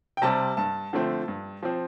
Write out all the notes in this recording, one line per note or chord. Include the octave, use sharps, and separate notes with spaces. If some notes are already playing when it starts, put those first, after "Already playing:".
G5
C3 G3 C4 A5
G2 A5
D3 F3 A3 C4
G2
F3 C4